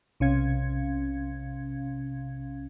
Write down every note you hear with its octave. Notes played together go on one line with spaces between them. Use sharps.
B1 C3 C#4 F5 G#6